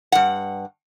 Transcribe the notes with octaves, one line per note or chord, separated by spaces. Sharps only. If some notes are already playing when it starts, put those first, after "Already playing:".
G2 F#5